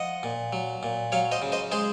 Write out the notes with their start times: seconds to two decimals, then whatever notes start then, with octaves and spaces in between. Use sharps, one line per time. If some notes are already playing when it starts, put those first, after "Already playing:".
Already playing: F3 D#5 F#5
0.23 A#2
0.53 F#3
0.83 A#2
1.12 F#3 C#5 F5
1.32 C5 D#5
1.42 C#3
1.52 C5 D#5
1.72 G#3 G#4 C5